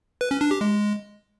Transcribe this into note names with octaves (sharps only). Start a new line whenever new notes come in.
B4
C#4
D4
G4
G#3